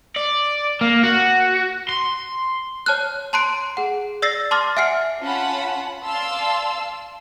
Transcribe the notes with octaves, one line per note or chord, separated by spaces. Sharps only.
D5
A#3
F#4
C6
C#5 A5 F6 F#6
A5 A#5 C6 F#6 C7 D7
G#4 F#5
D5 E6 A6 A#6 C7
A5 C6 D6 F6 A6
E5 F#5 G#5 F6 C7 C#7
C#4 F4 F#5 A5 B5
D5 F5 A5 C6 E6